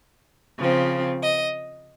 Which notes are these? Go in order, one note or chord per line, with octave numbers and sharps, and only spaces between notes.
C#3 F3 C4
D#5